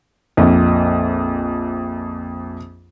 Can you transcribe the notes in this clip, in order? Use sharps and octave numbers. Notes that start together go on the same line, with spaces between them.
A#1 F2